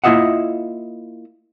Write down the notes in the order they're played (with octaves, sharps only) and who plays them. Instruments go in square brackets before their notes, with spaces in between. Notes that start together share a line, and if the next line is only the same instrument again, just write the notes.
[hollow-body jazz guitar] A#3 E4 F4 D#5 E5 F#5